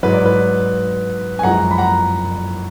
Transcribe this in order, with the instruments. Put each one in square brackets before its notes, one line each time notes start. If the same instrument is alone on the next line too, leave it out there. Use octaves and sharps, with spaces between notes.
[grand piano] G#2 F#3 B4
D5
B4
G#5
F#2 F3 G#3 F#5 A#5
B5
F#5 A#5